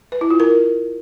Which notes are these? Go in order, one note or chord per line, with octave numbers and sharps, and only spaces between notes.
B4
E4
F4
A#4